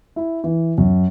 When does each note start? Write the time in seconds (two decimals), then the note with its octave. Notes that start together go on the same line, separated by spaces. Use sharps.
0.16 E4
0.44 E3
0.78 F#2